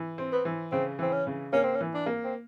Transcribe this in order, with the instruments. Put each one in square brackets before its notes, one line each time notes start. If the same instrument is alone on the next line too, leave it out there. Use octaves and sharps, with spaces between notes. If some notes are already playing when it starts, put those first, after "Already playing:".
Already playing: [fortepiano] E3
C4
[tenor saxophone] B3
[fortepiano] E3
[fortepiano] C#3 [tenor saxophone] C4
[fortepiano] E3 [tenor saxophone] C4
[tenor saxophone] C#4
[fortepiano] C#3
[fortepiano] A#3 [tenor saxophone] C#4
[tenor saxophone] C4
C#4
[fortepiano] E3
[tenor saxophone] D4
[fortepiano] A#3
[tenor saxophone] C4